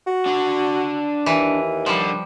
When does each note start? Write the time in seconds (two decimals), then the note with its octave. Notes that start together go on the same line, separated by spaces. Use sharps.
0.07 F#4
0.26 D4 F#5
1.26 D#2 E3
1.86 D3 F3 G3